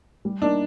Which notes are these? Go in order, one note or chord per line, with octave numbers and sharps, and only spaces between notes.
G3
A#3 D4 D#4